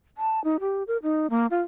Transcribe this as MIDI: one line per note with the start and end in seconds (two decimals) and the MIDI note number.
0.17 0.42 81
0.44 0.56 63
0.60 0.83 67
0.87 0.97 70
1.03 1.27 63
1.30 1.46 58
1.50 1.62 65